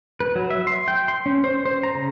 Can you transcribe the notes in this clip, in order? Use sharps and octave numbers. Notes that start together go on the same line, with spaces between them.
B4
F#3
E5
C6
G5
C6
C#4
C5
C5
A#5
C#3